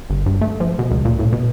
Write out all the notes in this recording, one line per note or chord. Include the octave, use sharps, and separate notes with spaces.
G1
G2
A3
F3
B2
C#2
A#2
A2
B2